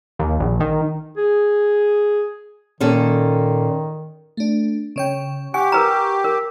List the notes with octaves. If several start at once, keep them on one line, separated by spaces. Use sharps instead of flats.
D#2
A#1
D#3
G#4
A#2 D#3 C#4 A4
A3 D4
C#3 C#5 G5
G4 F#5 G#5 C#6
A#4 B4 A#5
A#4